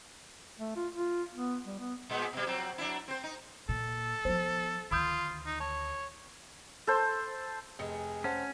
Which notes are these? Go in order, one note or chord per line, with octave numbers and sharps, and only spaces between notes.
A3
F4
F4
B3
G3
B3
A#2 G#3 B3
B2 G3
F3 F#3 C4
F#3 D4 E4
C4 C5
D#4
A#2 A4
F3 B3 C5
D2 D#3 F4 B5 D#6 G6
D#4
C#5 A5
A4 C5
F1 G#4 D#5 C#7
C#4 C5 F#5 A5